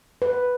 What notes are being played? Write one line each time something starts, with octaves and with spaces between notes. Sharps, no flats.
B4